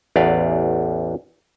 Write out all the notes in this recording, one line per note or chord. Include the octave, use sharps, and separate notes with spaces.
A1 E2 B4 D5 F5